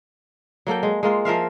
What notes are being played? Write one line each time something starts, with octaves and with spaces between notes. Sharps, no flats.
F#3 A#3 A4 G5
G#3
G#3 A#3 F4
F3 A#4 E5 F5